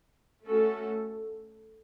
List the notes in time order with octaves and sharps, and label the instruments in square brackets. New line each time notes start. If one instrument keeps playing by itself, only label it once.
[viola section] A3 C#4 F#4 A4